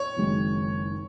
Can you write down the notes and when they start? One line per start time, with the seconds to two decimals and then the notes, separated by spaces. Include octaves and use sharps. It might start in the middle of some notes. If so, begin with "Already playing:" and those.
Already playing: C#5
0.17 F#1 F#2 D#3 G#3 C4